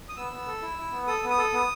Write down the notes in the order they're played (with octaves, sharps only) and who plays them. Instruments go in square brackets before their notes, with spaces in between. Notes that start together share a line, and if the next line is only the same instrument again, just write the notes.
[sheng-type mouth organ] D#6
B3 E6
B3
A4
E4
E4
B3
A4 D#6
B3
D#6
A4
B3